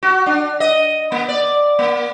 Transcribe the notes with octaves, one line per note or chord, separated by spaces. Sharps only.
F#4
D4
D#5
A#3
D5
A#3